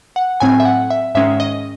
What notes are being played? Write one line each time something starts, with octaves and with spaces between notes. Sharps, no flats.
F#5
A2 F#3 C4 G#5
E5
F#5
E5
G#2 D#3 G#3 C#4 E5
D#5